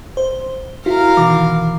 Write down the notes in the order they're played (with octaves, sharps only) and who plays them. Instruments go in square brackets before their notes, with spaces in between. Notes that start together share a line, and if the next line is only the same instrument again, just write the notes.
[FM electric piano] C5
[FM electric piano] E4 [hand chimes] F#4 [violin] A#4 F5
[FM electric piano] B2 D#3 E3 [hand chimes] D6